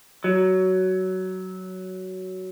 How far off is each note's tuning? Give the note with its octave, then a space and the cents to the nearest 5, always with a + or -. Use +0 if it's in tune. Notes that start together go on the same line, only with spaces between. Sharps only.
F#3 +10